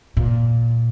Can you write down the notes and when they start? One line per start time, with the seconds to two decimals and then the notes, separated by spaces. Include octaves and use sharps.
0.17 A#2